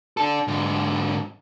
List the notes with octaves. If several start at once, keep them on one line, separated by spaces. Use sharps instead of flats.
D4 A4
G#2 D3